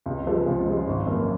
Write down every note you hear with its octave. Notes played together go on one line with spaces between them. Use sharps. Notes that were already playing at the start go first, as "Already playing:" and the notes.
C#2
C#3 F3 G#3
C#2
C#3 F3 G#3
G#1
F#2 F3 A#3 F4